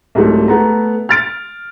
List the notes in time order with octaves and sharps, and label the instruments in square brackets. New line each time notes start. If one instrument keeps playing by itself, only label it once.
[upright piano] C2 G#2 F#3 A3
A3 B3 A#5
F6 A6 D7